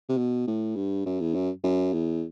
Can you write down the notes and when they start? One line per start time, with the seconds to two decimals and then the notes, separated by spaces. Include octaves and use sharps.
0.09 C3
0.18 B2
0.47 A2
0.76 G2
1.06 F#2
1.20 E2
1.34 F#2
1.64 F#2
1.93 E2